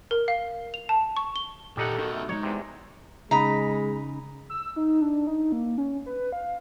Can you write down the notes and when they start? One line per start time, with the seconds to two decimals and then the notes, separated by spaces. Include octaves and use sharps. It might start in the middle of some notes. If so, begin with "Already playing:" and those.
0.11 A#4
0.28 F5
0.74 F7
0.89 A5
1.16 C#6
1.36 G7
1.77 A#2 G3 D#4 G4 A4 F#5 A#5
1.99 D#3 D#4 F#4
2.12 A3
2.29 G3 G#3 D#4 C#5
2.43 E2 C3
3.31 C#3 G#3 D#4 A#5 B5
4.50 E6
4.76 D#4
5.01 D4
5.27 D#4
5.52 A#3
5.78 C#4
6.06 B4
6.32 F5